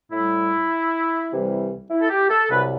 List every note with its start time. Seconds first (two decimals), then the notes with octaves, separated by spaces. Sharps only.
0.12 A2 G3 E4
1.31 C2 C3 E3 G3
1.90 E4
2.01 A4
2.10 G4
2.29 A4
2.50 C2 C3 F#3 B4